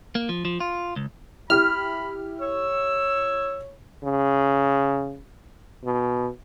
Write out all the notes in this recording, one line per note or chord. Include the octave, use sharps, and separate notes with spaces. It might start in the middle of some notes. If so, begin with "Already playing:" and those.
A#3
F3
F3
F4
C#2
E4 G4 B5 F6
C#5 E6
C#3
B2